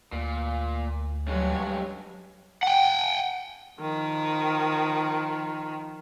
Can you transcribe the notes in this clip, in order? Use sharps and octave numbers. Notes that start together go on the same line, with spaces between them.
D2 A#2
G2 F#3 G#3 C#5
F#5 G5
D#3 F3